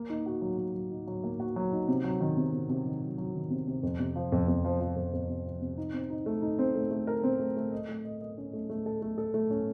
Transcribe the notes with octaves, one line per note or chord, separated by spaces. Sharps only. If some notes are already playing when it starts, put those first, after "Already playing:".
Already playing: A#3
D#4
F#4
F#3
F#3
F#3
D#4
F#3
A#3
F#4
F#3
D#4
C3
F#3
D#3
C3
C3
C3
D#3
F#3
F#3
D#3
C3
C3
F2
C3
F3
F2
F2
F3
F3
F2
F2
C3
F3
C3
D#4
C4
D#4
A3
D#4
C4
A3
A3
A#4
C4
A3
A3
D#5
A3
D#5
D#5
C#4
A3
A3
A4
A3
A4
A3
C#4